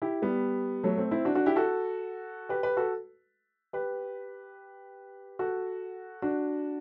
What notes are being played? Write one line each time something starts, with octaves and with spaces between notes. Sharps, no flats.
E4 G4
G3 B3
F#3 A3
A3 C4
C4 E4
D4 F#4
D4 F#4
E4 G4
F#4 A4
G4 B4
G4 B4
F#4 A4
G4 B4
F#4 A4
D4 F#4